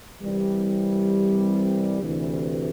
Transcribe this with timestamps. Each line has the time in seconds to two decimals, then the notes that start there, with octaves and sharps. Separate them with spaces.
0.19 C2 C3 E3 G3 C4
2.01 D2 C3 E3